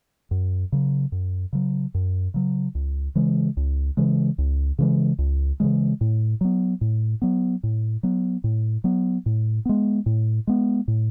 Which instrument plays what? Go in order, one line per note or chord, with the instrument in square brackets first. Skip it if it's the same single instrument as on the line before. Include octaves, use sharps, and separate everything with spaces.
[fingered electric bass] F#2
C#3 F#3
F#2
C#3 F#3
F#2
C#3 F#3
C#2
C#3 E3 G#3
C#2
C#3 E3 G#3
C#2
C#3 E3 G#3
C#2
C#3 E3 G#3
A2
F#3 B3
A2
F#3 B3
A2
F#3 B3
A2
F#3 B3
A2
G#3 B3
A2
G#3 B3
A2